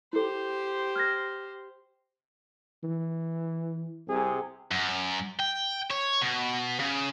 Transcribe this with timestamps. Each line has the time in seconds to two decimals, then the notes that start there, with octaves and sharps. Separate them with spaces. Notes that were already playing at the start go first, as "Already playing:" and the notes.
0.13 E4 G4 A4 C5
0.96 F6 G#6 A#6
2.84 E3
4.08 C2 C3 G#4
4.71 F#2
5.40 G5
5.91 C#5
6.22 B2
6.80 C#3